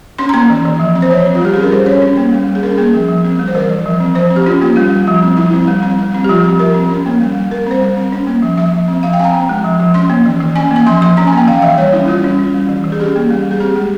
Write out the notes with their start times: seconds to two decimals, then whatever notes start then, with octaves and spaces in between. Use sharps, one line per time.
0.19 C#4 C6
0.29 A#5
0.34 A#3 C6
0.50 E3
0.65 E3
0.80 F3
0.95 C4
1.02 C5
1.11 F3 C#5
1.26 C4
1.35 F4
1.41 G3 G4
1.54 C#4 G#4
1.63 A#4
1.72 G3 C5
1.86 C#4 C#5
2.02 C#4
2.17 A#3
2.32 G3
2.47 G3
2.55 G#4
2.63 C#4 A#4
2.78 A#3 G#4
2.94 F3
3.08 F3
3.25 C4
3.39 G3
3.48 C5
3.55 E3 A#4
3.70 E3
3.86 F3
4.00 C4
4.15 F3 C5
4.30 C4
4.36 G4
4.46 C#4 F4
4.61 A#3 F4
4.76 G3 F4
4.92 G3
5.07 F3
5.22 C4
5.37 F3 E4
5.53 C4
5.67 G3
5.83 C4
5.99 G3
6.14 C4
6.24 G4
6.29 F3 F4
6.44 C4
6.59 F3 A#4
6.74 C4
6.89 C#4
7.06 A#3
7.21 G3
7.35 G3
7.50 G3 A#4
7.66 C4 C5
7.81 G3
7.97 C4
8.12 C#4
8.27 A#3
8.42 F3
8.57 F3 E5
8.73 F3
8.88 C4
9.03 F3 F5
9.13 G5
9.19 C4 G#5
9.24 A#5
9.34 C4
9.49 G#3
9.64 F3
9.79 F3
9.94 C#4 C6
10.10 A#3
10.26 E3
10.40 E3
10.56 C#4 G#5
10.71 A#3
10.76 G#5
10.86 F3 C6
11.01 F3 C6
11.17 C#4 A#5
11.27 G#5
11.32 A#3
11.38 G5
11.47 E3 F5
11.62 E3 E5
11.78 G3 C#5
11.93 C#4 E4
12.08 G3 F4
12.24 C#4
12.39 C#4
12.55 G3
12.69 E3
12.84 E3
12.92 G#4
13.00 C#4 G4
13.16 A#3
13.30 G3
13.45 G3
13.51 G#4
13.60 C4 G4
13.76 G#3